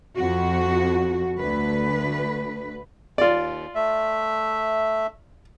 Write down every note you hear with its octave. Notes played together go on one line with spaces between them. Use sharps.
F2 F#4
D2 B4
D#2 F4 D5
A3 E5